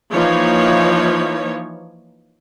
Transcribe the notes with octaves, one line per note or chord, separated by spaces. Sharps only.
E3 F3 A#3 D#4 C#5